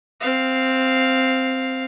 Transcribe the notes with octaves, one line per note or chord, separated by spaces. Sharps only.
C4 F5